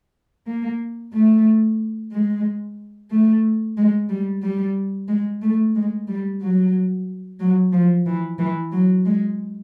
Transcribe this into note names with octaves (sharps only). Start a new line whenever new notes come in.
A#3
A3
G#3
A3
G#3
G3
G3
G#3
A3
G#3
G3
F#3
F#3
F3
E3
E3
F#3
G#3